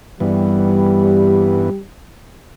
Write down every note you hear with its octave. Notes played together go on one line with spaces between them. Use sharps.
G2 E3 G3 B3